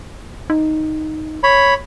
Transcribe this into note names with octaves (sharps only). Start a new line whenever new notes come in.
D#4
C#5 B5